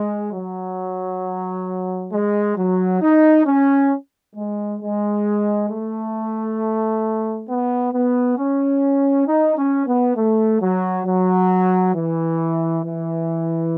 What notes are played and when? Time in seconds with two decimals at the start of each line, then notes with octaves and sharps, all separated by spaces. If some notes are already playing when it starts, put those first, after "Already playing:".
Already playing: G#3
0.33 F#3
2.12 G#3
2.57 F#3
3.02 D#4
3.46 C#4
4.36 G#3
4.80 G#3
5.69 A3
7.49 B3
7.94 B3
8.38 C#4
9.28 D#4
9.57 C#4
9.87 B3
10.16 A3
10.62 F#3
11.05 F#3
11.95 E3
12.85 E3